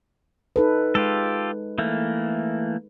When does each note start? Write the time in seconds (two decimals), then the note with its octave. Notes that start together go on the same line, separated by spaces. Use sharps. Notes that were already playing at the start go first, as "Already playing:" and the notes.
0.56 D#4 A4 B4
0.95 G#3 F4 G4 A4
1.78 E3 A3 A#3